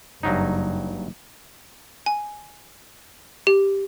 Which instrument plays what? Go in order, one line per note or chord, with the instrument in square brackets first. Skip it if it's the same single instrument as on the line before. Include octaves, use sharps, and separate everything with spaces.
[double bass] F#1 [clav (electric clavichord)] G2 F#3 D#4
[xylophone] G#5
G4